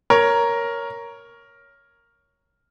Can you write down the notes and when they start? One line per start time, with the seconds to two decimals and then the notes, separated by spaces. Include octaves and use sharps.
0.10 A#4 C#5